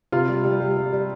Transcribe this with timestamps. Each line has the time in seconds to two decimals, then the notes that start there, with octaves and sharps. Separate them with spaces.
0.12 C3 F4
0.29 G3
0.44 G3
0.61 G3
0.77 G3
0.93 G3